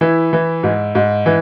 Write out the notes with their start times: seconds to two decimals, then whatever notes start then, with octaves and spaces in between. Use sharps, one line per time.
0.01 E3 E4
0.33 E3
0.63 G#2
0.95 G#2
1.26 E3